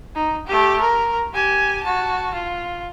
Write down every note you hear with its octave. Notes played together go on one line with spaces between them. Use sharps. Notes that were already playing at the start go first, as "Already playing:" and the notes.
D#4
A3 G4
A#4
G4 G#5
F#4 A5
F4